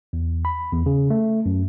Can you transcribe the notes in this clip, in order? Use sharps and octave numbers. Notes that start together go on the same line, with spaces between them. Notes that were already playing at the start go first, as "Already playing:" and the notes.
E2
B5
E2
C#3
A3
F#2